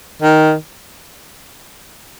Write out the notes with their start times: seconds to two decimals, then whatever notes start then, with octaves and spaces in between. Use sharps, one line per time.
0.22 D#3